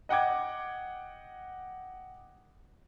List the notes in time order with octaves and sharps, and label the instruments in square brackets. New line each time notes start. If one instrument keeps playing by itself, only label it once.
[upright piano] D#5 F#5 G5 D6 G#6